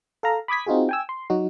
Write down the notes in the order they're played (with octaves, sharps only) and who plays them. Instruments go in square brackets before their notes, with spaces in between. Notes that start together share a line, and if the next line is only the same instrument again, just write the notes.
[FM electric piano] A4 F5 A#5
B5 D6 D#6 G#6 B6
C4 D#4 F4 F#4 G#4
G5 G#5 E6
C6
F#3 D#4 F#4